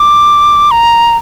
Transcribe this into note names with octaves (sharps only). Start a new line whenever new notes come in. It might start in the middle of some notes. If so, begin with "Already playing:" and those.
Already playing: D6
A#5